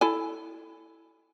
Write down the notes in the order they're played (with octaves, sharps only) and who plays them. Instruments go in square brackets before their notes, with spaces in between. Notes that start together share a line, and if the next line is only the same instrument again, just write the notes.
[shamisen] E4 A4 G#5